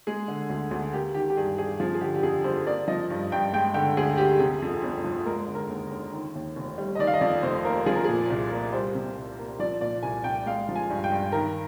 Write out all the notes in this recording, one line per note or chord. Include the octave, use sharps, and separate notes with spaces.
G#3 G#4
D3
D2
D2
A#3 G4
D#3 G4
G4
G2 G#4
G2 G#4
F3 G#4
G#4
D3 G4
G4
F2 G#4
F2 C5
A#3 D5
F3 D#5
G2
G2 G5
G#3 G5
D3 G5
D2 G#4
D2 G4
C3 G#4
F2
G1
F3
G#3 A#4
D3
A#4
D#2
D#2
D#3
D#2
F1
G3
D#5
D#3 D5
F5
D#5
F2 D5
F1 C5
A#3 A#4
F3 G#4
A#4
A#2 G#4
C2
A#3
G3 C5
C3
C2
A#3
F3 D5
A#2 D5
C2 G#5
C2 G5
G#3 F5
F3
G#5
G2
G5
G2
D#3 A#4